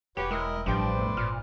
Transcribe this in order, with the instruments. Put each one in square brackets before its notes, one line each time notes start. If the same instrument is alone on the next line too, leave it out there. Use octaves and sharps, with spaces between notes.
[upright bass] E1 [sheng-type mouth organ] F#4 B4 C#5 [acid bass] G4 [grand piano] G5
[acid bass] G#3 [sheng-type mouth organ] E4 A#4 D#5
[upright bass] A1 G3 [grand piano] G2 G5 [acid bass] F3 [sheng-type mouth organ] B4 C5 D5
[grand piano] E1 A2
[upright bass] G#1 [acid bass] A#2 [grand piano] F6